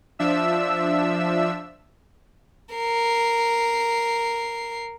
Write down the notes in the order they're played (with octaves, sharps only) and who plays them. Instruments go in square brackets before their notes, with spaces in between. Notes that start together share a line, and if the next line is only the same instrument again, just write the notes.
[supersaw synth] F3 D4 E5 E6
[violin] A#4 C7